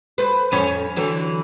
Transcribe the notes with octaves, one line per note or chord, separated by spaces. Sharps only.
B4 C5
F2 C#4
D3 E3 F#3